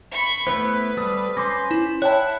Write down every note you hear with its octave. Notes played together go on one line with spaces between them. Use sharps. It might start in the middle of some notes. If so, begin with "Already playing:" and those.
B5 C#6
A3 B3 E4 B4 C5
G3 A4 D#6
C#4 C5 C6 D6 A#6
E4
E4 C#5 F#5 G5 A5